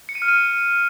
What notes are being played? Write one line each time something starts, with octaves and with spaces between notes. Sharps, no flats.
C#7
D#7
F6
D#7